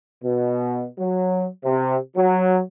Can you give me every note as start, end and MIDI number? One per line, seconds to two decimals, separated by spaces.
0.24 0.87 47
0.99 1.47 54
1.65 1.98 48
2.17 2.61 54